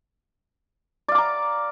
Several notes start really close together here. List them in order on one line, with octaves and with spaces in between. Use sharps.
D5 F5 D6 A#5